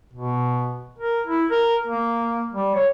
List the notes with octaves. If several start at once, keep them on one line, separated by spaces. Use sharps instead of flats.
B2
A#4
E4
A#4
A#3
G3
C#5